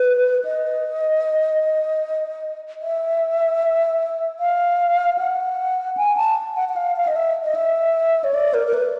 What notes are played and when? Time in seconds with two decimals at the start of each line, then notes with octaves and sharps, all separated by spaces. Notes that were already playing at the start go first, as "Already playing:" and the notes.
Already playing: B4
0.45 D#5
2.82 E5
4.40 F5
5.18 F#5
5.97 G#5
6.17 A5
6.56 F#5
6.69 F#5
6.76 F5
6.96 F5
7.07 D#5
7.16 E5
7.44 D#5
7.55 E5
8.24 C#5
8.34 D5
8.54 A#4
8.67 A#4
8.74 B4